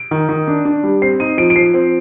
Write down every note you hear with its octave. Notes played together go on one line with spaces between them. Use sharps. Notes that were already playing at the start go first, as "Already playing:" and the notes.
Already playing: D7
D#3
D#3
D4
D4
G3
C4 C7
D#4 D#7
F3 D7
D7
F3 C7
C4